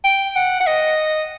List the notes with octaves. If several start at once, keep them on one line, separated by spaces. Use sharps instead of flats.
G5
F#5
F#5
D#5